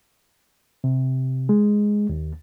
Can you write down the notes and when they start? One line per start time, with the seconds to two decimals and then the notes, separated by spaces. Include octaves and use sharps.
0.84 C3
1.49 G#3
2.09 D#2